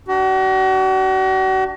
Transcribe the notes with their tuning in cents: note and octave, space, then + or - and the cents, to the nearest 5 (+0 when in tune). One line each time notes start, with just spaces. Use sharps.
D4 +0 F#4 +40